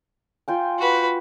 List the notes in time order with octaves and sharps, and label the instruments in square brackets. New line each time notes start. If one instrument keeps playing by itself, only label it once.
[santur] F4 G5 G#5
[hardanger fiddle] F#4 B4